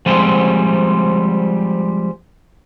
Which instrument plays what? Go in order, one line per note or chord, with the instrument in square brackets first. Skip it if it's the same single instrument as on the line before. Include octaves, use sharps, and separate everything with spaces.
[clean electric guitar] F3 G3 G#3 C4